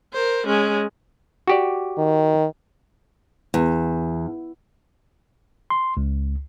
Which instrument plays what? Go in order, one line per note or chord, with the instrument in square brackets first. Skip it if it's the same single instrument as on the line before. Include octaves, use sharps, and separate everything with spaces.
[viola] A#4 C5
G#3 C#4
[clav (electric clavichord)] F#4 G4 D5
[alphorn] D#3
[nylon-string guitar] E2
[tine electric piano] C6
C#2